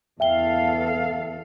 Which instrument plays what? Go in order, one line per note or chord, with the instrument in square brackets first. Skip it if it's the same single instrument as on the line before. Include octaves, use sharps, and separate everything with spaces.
[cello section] E2 A4 F5 [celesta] E5 G5 G7